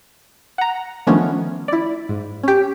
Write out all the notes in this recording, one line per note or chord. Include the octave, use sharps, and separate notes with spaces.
F#5 A#5
D#3 F3 A3 B3 C#4 D4
E4 D5
G#2
C#4 G4